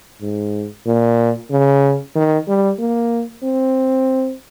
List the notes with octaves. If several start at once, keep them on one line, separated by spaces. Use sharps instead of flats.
G#2
A#2
C#3
D#3
G3
A#3
C4